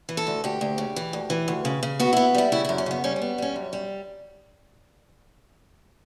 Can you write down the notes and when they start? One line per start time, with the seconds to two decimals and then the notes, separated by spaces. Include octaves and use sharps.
0.09 E3
0.17 A4
0.27 D2
0.44 D2 G4
0.61 D2
0.78 C#3
0.96 E3
1.13 D2
1.30 E3
1.48 D2
1.65 C#3
1.83 C#3
2.00 B3 F#4
2.13 B3 E4
2.35 G3 E4
2.52 C#3 E4
2.65 F#2 E4
2.78 C#4
2.86 C#3 B3
3.04 G3 C#4
3.16 C#4
3.22 B3
3.38 G3 C#4
3.56 F#2
3.73 G3